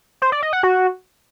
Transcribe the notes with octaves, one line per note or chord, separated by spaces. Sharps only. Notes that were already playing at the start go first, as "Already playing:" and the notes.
C5
D5
D#5
F#5
F#4